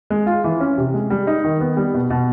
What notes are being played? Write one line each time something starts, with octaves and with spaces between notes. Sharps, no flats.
G#3
F4
E3
C#4
C3
G#3
G3
D#4
D#3
B3
G3
B2
B2